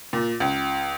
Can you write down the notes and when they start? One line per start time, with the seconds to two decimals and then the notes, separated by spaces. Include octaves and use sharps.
0.13 A#2
0.40 C#2